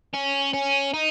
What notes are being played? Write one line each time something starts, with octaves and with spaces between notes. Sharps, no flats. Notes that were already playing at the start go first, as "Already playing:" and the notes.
C#4
C#4
D#4